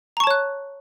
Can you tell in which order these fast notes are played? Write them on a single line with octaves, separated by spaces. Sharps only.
A#5 C#6 A5 C#5 F#6